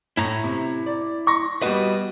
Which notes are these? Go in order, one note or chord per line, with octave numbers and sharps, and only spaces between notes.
A2 E4 A#5
C3
D5
C6 C#6 A#6
G3 B3 F#4 D#5